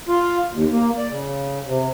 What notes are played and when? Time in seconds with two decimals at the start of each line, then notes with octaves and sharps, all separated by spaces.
0.08 F4
0.53 D#2
0.72 A#3
0.98 D5
1.11 C#3
1.67 C3